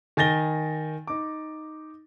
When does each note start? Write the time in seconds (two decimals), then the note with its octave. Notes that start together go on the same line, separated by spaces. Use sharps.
0.17 D#3 G#5 A6 A#6 G7
1.07 D#4 D6